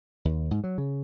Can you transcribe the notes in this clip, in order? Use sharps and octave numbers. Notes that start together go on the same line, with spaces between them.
D#2
G#2
F#3
C#3